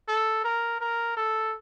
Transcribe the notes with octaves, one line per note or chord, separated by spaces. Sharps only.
A4
A#4
A#4
A4